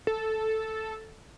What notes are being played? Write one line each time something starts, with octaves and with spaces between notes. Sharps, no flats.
A4